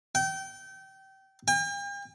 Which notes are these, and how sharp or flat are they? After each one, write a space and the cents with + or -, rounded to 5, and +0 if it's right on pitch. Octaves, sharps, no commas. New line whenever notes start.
G5 -25
G5 +45